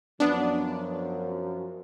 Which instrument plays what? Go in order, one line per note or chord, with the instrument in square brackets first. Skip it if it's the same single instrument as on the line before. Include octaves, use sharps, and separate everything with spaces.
[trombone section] F#2 F3 [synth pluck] B3 D4